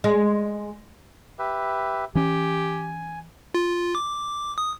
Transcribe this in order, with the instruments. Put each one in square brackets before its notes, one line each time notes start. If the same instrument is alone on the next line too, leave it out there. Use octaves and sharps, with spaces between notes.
[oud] G#3
[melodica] G4 B4 E5
[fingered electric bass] E3 C#4 [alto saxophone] G4 [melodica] G#5
[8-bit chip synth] F4
D6
D#6